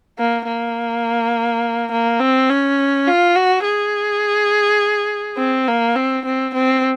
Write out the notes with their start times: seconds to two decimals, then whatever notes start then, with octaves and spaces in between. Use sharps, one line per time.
0.19 A#3
0.47 A#3
1.92 A#3
2.20 C4
2.50 C#4
3.07 F4
3.36 F#4
3.65 G#4
5.38 C4
5.68 A#3
5.96 C4
6.26 C4
6.55 C4